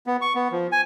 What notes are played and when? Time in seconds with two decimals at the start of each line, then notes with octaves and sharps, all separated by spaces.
0.07 B3
0.21 C#6
0.35 B3
0.51 F3
0.72 G#5